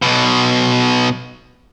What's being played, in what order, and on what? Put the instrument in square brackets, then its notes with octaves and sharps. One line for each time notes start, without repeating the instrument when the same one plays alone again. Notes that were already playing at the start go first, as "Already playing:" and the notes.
[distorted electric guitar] B1 B2